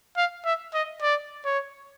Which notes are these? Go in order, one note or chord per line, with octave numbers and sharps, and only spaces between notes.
F5
E5
D#5
D5
C#5